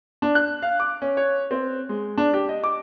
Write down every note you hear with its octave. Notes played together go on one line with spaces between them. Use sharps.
D4
F#6
F5
D6
C#4
C#5
C4
G#3
D4
G4
D#5
D6